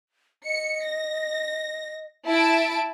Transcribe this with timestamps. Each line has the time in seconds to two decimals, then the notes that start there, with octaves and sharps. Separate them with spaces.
0.45 D#5 C#7
0.87 A#6
2.26 E4 E5 A5 D7